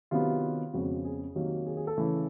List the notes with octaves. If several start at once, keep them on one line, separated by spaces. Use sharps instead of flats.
C3 D#3 F#3 B3 F4
F2 C#3 F3 G#3 B3 F#4
G#4
C3 D#3 F#3 A#3
G#4
G#4
A4
C#3 E3 A3